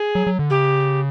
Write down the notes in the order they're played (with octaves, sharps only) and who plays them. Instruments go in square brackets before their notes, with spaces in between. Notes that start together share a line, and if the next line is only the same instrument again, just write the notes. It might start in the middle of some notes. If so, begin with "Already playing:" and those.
Already playing: [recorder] G#4
[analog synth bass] F#3
F#3
D3
[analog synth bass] C#3 [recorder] G4